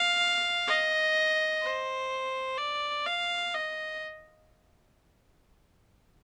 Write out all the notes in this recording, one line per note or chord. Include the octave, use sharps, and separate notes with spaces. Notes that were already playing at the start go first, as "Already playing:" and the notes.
Already playing: F5
D#5
C5
D5
F5
D#5